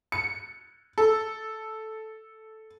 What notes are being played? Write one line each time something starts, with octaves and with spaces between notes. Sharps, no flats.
C#7
A4